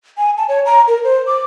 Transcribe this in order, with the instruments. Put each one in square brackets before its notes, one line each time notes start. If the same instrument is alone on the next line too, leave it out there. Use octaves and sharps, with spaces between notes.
[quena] G#5
A5
C#5
A#5
A#4
C5
D6